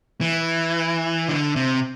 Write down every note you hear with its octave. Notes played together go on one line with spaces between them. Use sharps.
E3
D3
C3